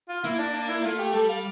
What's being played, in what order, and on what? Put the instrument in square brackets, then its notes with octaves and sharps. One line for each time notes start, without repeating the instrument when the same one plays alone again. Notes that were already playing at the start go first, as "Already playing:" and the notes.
[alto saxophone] F4
[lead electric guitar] A#3 [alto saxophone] E4
[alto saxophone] D4
D4
E4
[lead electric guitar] A3 [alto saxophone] F4
[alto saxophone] G4
[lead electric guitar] G3 [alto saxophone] A4
[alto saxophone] F5